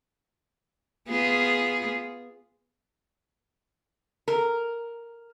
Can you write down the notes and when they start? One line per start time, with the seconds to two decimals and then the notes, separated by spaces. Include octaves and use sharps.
1.08 B3 F4 G#4
4.28 A#4